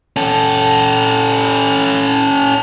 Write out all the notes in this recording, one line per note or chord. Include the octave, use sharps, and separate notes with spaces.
C#4 A4